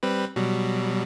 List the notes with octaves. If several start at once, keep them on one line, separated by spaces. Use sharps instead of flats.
G3 C4 B4
B2 F#3 G3